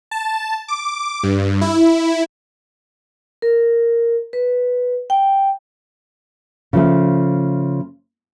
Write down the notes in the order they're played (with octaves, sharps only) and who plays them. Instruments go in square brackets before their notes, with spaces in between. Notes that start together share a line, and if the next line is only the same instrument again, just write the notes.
[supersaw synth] A5
D6
G2
E4
[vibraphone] A#4
B4
G5
[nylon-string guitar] C#3 F3 A3